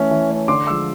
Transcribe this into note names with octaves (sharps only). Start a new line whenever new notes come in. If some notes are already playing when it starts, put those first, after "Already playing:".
Already playing: E3 A3 C#4
E3
A3 C#4
D3 C6 D6
F3 G#3 D6 E6